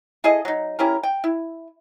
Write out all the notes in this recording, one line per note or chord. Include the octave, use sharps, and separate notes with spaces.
E4 G#4 A4 D#5
F#3 D#4
C#4 E4 G4 A#4
G5
E4